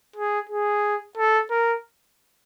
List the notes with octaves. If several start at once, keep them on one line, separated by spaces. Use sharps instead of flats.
G#4
G#4
A4
A#4